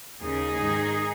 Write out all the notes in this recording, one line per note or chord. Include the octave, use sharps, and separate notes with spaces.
D#2 C#3 D#4 G#4
G#2 D#3